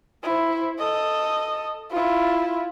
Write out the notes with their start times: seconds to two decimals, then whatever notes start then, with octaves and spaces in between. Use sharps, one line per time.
0.23 E4 C5
0.79 A4 D#5
1.91 E4 F4